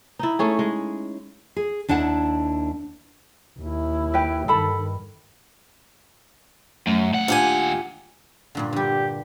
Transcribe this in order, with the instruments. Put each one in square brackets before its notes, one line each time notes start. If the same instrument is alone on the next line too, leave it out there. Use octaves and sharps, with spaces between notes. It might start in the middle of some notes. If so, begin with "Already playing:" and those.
[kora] D#4 E4
A3 C#4 G#4
G#3
[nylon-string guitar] G#4
D#2 D4 E4 F#5 A5
[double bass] D#2 E4
[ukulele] G4 B4 G5
[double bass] G2 D#3 [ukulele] A4 A5 B5
[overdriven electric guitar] F#2 [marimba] A3
[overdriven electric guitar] D#2 F#5
[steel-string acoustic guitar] A#2 G4 G#5 [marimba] D4
[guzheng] G2 A#2 D3
[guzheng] D3 G3 [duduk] G4